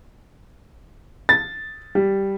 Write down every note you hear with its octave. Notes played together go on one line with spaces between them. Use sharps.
A6
G3